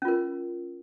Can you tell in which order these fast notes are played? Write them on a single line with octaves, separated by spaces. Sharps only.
C#4 F4 A#4